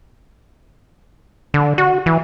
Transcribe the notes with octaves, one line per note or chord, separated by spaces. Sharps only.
D3
F#4
E3